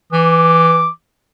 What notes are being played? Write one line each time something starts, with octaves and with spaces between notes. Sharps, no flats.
E3 D6